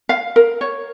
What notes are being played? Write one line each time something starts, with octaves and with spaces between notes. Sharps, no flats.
F5
A#4
C#5